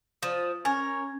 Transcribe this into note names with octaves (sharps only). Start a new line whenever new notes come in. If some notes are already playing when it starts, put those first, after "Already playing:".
F3 D#6
C#4 A#4 C#5 G#5